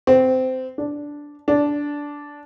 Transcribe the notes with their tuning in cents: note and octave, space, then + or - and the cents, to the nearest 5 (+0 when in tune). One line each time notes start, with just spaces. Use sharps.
C4 -15
D4 -5
D4 -10